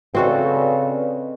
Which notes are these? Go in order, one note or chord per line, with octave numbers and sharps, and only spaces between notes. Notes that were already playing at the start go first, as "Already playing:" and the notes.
C#3 C4 F#4 A4 B4 D5 D#5